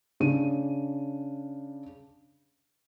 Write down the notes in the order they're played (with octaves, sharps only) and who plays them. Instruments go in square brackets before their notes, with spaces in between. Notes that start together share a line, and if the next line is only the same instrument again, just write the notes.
[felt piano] C#3 D4 D#7